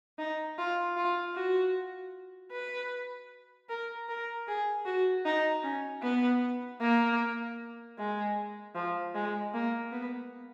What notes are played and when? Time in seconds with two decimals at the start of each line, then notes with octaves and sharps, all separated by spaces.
0.18 D#4
0.58 F4
0.97 F4
1.35 F#4
2.52 B4
3.69 A#4
4.09 A#4
4.48 G#4
4.86 F#4
5.25 D#4
5.64 C#4
6.02 B3
6.81 A#3
7.98 G#3
8.75 F3
9.14 G#3
9.54 A#3
9.92 B3